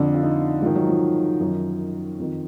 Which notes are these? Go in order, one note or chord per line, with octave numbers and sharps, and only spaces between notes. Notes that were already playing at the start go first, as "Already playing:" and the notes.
Already playing: F2 D3 D4
F4
D#4
G#2 D#3 F3
F#3
F3
F#2 D#3
F2 D#3